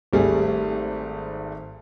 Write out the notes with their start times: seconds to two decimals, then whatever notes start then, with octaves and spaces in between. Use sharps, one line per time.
0.13 G#1 G3 A3 G#4